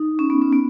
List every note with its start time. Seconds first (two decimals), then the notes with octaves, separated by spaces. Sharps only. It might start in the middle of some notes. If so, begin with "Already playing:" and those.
Already playing: D#4
0.19 C#4
0.30 B3
0.42 C#4
0.52 B3